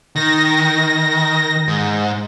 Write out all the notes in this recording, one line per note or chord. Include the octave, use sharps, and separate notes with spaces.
D#3 A#6
G#2